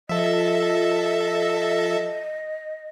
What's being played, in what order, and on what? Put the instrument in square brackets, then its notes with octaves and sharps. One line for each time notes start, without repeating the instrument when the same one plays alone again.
[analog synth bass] F3 [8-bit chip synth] A4 E5 [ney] D#5